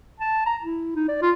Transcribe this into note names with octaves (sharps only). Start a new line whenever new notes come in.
A5
A#5
E4
D#4
D5
F4